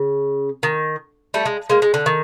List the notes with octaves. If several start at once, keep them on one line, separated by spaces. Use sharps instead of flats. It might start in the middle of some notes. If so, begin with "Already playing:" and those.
Already playing: C#3
D#3
G3 A3
G#3
G#3 A#3
G#3
D3
D#3